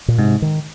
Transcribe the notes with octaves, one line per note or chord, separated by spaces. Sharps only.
A#2
G#2 C3
D#3